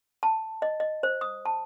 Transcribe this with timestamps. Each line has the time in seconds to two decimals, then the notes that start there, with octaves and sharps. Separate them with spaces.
0.23 A5
0.62 D#5
0.80 D#5
1.03 C5
1.21 D#6
1.45 A5